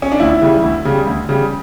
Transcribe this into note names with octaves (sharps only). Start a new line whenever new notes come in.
C#4
D4
D2 E4
C#3 E3 G3
D2
C#3 G3
D2
C#3 G3